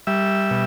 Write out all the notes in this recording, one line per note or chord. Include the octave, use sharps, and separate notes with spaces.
G3 E5
B2